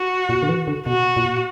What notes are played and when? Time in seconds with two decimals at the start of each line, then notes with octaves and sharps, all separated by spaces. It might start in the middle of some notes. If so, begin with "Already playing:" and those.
Already playing: F#4
0.29 A#2
0.43 D3
0.49 E3
0.67 D3
0.86 B2 F#4
1.16 A#2